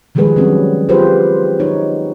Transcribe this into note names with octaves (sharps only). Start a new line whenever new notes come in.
D#3 F3 G3 G#3 G#4 B4
F#3 G3 C4 C#4 F#4
G3 F4 G4 G#4 B4 C5
D#4 C#5